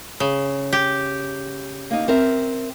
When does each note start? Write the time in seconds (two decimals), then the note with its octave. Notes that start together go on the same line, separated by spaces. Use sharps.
0.20 C#3
0.73 G4
1.91 A#3 D#4
2.08 C4 A#4 E5